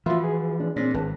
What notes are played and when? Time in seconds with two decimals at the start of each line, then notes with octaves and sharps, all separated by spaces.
0.06 E3 F3 F4 F#4 B4 E5 C6
0.24 G#4
0.60 D4
0.76 A#2 C4 D4
0.94 G#1 B4 A5